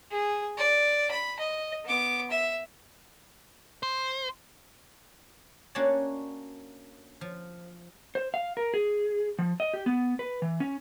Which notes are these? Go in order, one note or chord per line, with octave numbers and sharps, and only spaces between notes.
G#4
D5
B5
D#5
B3 D6
E5
C5
A#3 C#4 D4 F#4 C#5 A5
F3
C5
F5
A#4
G#4
F3
D#5
G4
B3
B4
E3
C#4